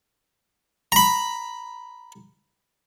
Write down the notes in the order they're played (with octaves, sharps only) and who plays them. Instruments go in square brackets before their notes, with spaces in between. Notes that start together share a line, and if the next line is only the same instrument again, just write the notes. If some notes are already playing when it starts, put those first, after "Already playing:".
[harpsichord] A#5 B5